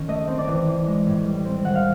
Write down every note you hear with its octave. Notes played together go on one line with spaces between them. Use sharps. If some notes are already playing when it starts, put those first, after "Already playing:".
Already playing: D#3 C#4
A3 D#5
C4
D5
E3
E3
G#3
A2
G3
C4
D#3 F#5
F5